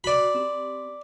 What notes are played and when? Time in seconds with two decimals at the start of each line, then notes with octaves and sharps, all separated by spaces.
0.04 F#4 D5 B5
0.34 C4 G4